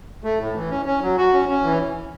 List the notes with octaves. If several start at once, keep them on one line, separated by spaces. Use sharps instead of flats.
A3
A2
E3
C#4
C#4
F#3
F#4
C#4
C#4
E3